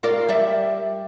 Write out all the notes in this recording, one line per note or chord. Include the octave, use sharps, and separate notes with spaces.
F4 A#4 D5
G3 D5 E5